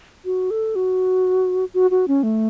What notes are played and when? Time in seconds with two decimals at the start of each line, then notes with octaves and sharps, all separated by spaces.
0.25 F#4
0.51 A4
0.75 F#4
1.74 F#4
1.91 F#4
2.08 C#4
2.23 A3